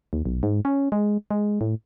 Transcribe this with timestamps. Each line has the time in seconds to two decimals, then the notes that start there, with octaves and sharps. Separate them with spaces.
0.13 D#2
0.25 B1
0.43 G#2
0.65 C#4
0.92 G#3
1.31 G#3
1.61 A2